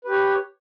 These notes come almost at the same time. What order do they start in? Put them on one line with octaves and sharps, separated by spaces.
B4 G4 C#5